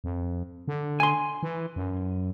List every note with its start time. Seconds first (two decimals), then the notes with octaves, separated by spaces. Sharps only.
0.04 F2
0.68 D3
1.00 G#5 C6
1.43 E3
1.76 F#2